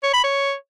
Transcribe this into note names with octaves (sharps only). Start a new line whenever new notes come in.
C#5
B5
C#5